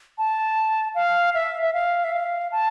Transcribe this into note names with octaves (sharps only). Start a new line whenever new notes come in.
A5
F5
E5
E5
F5
E5
F5
A5